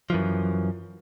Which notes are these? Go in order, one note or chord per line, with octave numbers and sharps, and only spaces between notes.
F#2 E3 F3